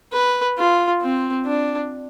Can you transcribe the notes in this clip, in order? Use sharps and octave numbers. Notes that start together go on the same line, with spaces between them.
B4
F4
C4
D4